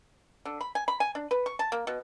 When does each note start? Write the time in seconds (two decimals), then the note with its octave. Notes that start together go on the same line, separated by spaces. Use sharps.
0.45 D3
0.61 B5
0.75 G#5
0.88 B5
1.00 G#5
1.15 D4
1.31 B4
1.46 C#6
1.59 A5
1.72 A#3
1.87 B2